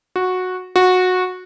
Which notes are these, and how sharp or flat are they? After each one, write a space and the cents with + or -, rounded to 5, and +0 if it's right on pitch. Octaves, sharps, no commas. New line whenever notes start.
F#4 -10
F#4 -15